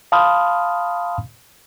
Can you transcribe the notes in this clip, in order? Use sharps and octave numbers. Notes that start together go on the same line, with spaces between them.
F5 A5 B5 C6 D#6 F6